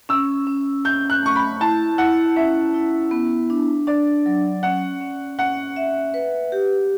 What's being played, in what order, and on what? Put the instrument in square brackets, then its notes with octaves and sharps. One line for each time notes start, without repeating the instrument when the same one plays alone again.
[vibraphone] C#4 [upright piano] E6
[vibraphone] C#4
[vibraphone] C#4 [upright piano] G6
[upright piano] F#6
[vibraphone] A3 [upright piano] C#6
[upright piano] B5
[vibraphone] E4 [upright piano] A5
[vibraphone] E4 [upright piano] F#5
[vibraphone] C#4 [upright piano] E5
[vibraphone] E4
B3
D4
[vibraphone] D4 [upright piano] D5
[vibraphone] F#3
[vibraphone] C#4 [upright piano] F#5
[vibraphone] C#4
[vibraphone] C#4 [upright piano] F#5
[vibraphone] E5
B4
G4